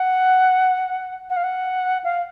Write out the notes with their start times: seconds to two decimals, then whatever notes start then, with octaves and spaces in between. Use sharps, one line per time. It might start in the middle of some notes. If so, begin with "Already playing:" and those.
Already playing: F#5
1.30 F#5
1.36 F5
1.43 F#5
2.04 F5